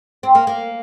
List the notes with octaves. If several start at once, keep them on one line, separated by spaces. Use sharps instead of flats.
C4
A#3
A#3